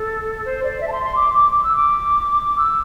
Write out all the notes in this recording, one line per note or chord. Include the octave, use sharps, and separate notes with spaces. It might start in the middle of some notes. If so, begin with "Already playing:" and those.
Already playing: A4
C5
D5
E5
A5
C6
C6
D6
D6
D6
E6
D6
E6